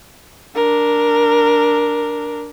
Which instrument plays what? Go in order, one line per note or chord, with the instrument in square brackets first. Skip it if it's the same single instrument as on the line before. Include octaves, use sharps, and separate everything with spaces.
[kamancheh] D4 A#4